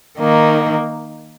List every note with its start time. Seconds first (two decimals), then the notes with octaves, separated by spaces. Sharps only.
0.18 D#3 A#3 D#4